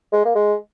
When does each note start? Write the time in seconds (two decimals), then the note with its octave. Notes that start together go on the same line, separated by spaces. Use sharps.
0.13 G#3
0.25 A#3
0.35 G#3